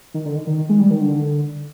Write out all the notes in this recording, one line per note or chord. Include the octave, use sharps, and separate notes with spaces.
D#3
D3
D#3
D#3
G#3
G3
D#3
D3